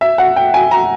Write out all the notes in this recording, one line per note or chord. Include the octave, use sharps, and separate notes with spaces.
E5
F#5
G5
G#5
A#5